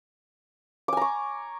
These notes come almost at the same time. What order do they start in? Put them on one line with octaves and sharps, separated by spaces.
D6 G#5 A#5 C#6